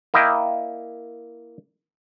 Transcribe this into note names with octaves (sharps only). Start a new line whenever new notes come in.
A#3 E4 D#5 G5